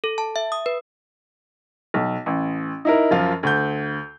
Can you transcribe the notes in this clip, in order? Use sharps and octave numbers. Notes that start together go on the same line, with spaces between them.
A4
A5
E5
D#6
B4
B1
A1
D#4 E4 A#4
F#2 F3 F4
D2 G6